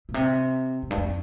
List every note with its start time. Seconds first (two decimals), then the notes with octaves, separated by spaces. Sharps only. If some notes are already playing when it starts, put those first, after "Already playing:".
0.09 A#2
0.14 C3
0.82 F2
0.91 G2
0.97 F2